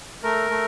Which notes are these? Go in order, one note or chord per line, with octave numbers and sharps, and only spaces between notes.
A3 A#4
A3